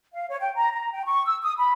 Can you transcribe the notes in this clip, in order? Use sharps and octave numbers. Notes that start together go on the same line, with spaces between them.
F5
C#5
G5
A#5
A#5
G5
C#6
E6
D#6
B5